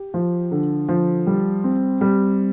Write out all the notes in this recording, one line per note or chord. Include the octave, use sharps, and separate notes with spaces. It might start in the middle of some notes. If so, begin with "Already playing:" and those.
Already playing: G4
F3
D3
F3
G3
C4
G3